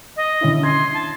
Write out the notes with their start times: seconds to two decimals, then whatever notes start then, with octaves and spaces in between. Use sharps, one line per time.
0.16 D#5
0.41 D3 C#4 E4
0.63 C6 G#6
0.94 A5